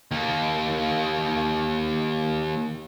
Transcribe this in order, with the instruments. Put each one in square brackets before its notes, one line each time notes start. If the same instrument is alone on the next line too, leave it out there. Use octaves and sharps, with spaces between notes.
[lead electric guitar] D#2 A#3